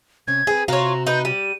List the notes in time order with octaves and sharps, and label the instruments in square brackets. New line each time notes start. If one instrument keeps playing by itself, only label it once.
[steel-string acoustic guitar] C3 C#4 [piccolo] G#6
[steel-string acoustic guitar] C4 B4 [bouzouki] G#4
[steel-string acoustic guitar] C3 F#4 C5 [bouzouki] F4 C#5 [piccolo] A#5
[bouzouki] D#4 B4 [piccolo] G6
[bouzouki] G3 [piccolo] D#7